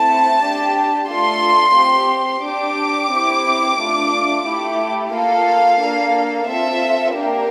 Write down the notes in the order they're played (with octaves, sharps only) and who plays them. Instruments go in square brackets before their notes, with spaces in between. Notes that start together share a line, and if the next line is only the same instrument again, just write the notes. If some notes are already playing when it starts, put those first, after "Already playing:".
Already playing: [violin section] A3 C4 E4 A5
D4 G4
A3 D4 F4 A4 C6
C4 G4
D4 G4 D6
C4 E4 G4
A3 D4 F4
A3 E4 G4
A#3 F4 A4 F5
A#3 D4 A4
C4 F4 A4 E5
A#3 D4 G4 A#4